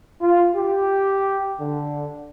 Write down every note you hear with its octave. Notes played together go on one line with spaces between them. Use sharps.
F4
G4
D3